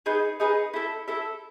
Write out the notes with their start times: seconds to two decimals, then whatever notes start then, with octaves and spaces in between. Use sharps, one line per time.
0.06 D#4 G#4 B4
0.40 D#4 G#4 B4
0.74 E4 A4 E5
1.08 E4 A4 E5